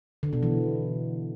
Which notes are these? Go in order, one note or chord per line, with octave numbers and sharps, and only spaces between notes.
D3
B2
E3